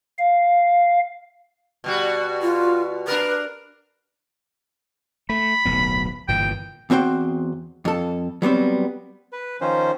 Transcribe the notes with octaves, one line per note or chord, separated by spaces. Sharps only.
F5
B2 G3 F#4
F4
D4 A#4 B4
A3 B5
D1 B1 B3
G1 A#2 E3 G5
E2 C4 F#4 C5 G5
F2 A4
F#3 G3 B3 C4
B4
D#3 F3 C#4 C5